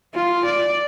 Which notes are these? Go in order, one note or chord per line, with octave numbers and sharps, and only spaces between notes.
F4
D5